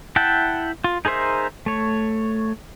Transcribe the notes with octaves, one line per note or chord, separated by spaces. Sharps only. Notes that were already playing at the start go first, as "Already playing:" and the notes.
E4 E5 F#5 G5 A5
F4
D#4 G#4 A#4 C5 E5
A3 C#5